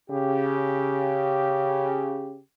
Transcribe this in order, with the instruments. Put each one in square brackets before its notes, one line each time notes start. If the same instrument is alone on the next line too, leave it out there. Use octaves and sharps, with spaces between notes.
[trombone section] C#3 G4